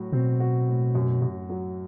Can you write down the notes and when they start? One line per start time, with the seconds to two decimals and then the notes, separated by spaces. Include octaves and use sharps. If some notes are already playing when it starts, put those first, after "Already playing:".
Already playing: A2 F#3 F#4
0.12 B2 C4
0.40 F#4
0.68 A2
0.95 F#2
1.22 F#2
1.49 F#3